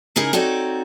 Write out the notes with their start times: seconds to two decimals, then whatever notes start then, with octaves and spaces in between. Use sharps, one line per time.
0.16 C#3 D#4 E4 G#4 A#4
0.33 C4 D#4 F#4 A4 C#5 D5